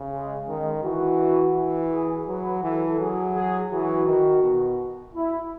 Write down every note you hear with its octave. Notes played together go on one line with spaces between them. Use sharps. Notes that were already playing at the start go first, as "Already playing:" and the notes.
Already playing: C#3
G#3
D#3 G#3
E3 F#4
E3
G#4
F#3 B4
E3 A4
F#3 G#4
G#4
E3 F#4
D#3
B2
E4